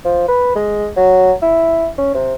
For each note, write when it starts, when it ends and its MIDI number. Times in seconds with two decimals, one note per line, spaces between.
0.05 0.26 53
0.28 0.51 71
0.56 0.88 56
0.97 1.32 54
1.42 1.87 64
1.98 2.12 61
2.14 2.34 48